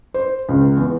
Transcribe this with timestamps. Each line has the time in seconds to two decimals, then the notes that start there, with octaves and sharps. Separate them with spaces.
0.14 C5
0.49 C#2
0.77 E2